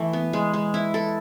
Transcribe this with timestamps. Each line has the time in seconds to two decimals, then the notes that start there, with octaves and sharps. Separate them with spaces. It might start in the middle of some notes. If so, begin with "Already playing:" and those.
Already playing: E3 A3
0.13 B3
0.33 G#3
0.54 G#3
0.74 E4
0.94 A4